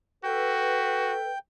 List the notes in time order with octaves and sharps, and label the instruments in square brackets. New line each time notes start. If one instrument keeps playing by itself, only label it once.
[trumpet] F#4 [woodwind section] A4 B4 [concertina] G5